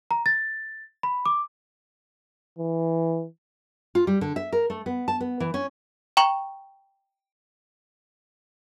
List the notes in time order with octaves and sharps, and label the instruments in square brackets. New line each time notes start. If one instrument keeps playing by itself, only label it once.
[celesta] A#5
A6
B5
D6
[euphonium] E3
[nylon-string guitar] F4
G3
D3
E5
A#4
A3
B3
A5
B3
E3
C#4
[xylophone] G5 A#5 C#6 F#7